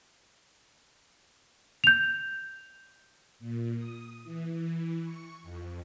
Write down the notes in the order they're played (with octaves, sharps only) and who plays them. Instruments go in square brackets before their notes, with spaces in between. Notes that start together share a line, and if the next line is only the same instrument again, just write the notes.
[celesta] G6 F7
[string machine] A#2
D#6
E3
E3
C#6
F2